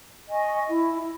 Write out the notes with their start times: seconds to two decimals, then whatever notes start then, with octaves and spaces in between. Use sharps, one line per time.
0.28 D#5 G#5 C#6
0.67 E4